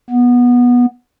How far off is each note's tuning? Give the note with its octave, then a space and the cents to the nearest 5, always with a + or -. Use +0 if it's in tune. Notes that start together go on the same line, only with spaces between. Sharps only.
B3 -15